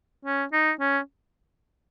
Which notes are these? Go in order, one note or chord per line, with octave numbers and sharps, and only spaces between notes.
C#4
D#4
C#4